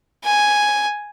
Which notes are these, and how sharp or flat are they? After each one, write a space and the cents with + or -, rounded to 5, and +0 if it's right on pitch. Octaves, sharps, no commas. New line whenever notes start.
G#5 +0